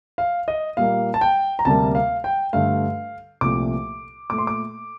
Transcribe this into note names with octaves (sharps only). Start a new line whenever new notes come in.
F5
D#5
A#2 G3 A#3 F5
A5
G5
A#5
D2 C3 G3 A#3 A5
F5
G5
G2 D3 A3 F5
C2 A#2 F3 A3 D6
A#2 A3 D6
C6
D6